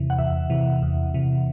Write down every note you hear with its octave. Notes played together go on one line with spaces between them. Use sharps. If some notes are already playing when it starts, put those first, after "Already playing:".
Already playing: E2 C3 E3
F#5
E2 E5
C3 E3
E2
C3 E3